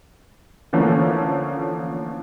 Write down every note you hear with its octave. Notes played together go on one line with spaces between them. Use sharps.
D3 E3 F3 A3 A#3 C#4